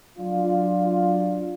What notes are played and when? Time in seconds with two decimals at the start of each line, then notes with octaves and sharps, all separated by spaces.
0.19 F#3 D4 F4